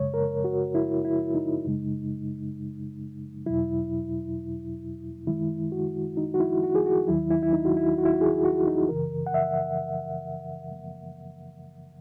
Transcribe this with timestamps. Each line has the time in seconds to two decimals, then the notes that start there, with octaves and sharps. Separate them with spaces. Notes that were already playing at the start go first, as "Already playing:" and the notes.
Already playing: F#2 C#3 G#3 C#5
0.14 A#4
0.44 F#4
0.75 E4
1.05 E4
1.35 D#4
1.65 F#2 C#3 G#3
3.46 E2 B2 F#3 E4
5.27 F#2 D#3 G#3 E4
5.72 F#4
6.17 D#4
6.34 F#4
6.40 E4
6.63 F#4
6.75 G#4
6.86 F#4
7.08 D#2 D#3 F#3 E4
7.31 E4
7.43 E4
7.53 D#4
7.65 F#4
7.77 E4
7.98 F#4
8.05 E4
8.14 F#4
8.21 G#4
8.45 F#4
8.67 D#4
8.89 F#2 C#3 E3 A#4
9.26 F#5
9.34 E5